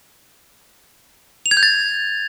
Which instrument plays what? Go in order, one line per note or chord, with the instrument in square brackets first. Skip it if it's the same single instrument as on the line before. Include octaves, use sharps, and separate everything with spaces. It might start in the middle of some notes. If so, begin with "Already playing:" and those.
[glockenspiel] F7
G#6
G6
A6